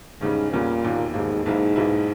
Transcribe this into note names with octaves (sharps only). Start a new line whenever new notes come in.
E2 G#2 C#3 G3 C#4
E2 A#2 C#3 G3 C#4
E1 D#2 D#3 A#3
E1 D#2 G#2 D#3 A#3
B1 G#2 B2 A#3 E4
B1 B2 A#3 E4